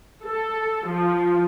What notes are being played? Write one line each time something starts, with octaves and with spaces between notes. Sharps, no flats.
A4
F3